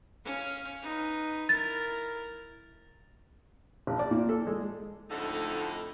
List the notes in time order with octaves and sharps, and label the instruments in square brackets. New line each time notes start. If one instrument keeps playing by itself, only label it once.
[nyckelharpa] C#4 F5
D#4 B4
[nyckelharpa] E4 A#4 [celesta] A6
[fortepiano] A#1
D5
A#2
A4
G#3
[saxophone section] F2 A2 D3 A3 D#4